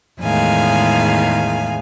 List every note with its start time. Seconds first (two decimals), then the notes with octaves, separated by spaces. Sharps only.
0.21 E2 A2 D#3 G#3 F5 G#5